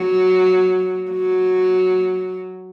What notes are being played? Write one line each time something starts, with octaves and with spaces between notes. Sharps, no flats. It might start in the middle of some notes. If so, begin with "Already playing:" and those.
Already playing: F#3
F#3